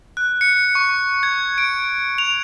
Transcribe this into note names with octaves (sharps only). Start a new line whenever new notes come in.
F#6
C#7
C#6
G#6
D7
F7